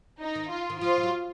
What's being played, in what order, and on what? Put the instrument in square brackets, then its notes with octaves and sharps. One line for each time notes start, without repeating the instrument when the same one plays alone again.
[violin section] D#4
[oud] D#3
[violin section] F4
[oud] D#3
[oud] F3 [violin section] F4
[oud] F3
F#3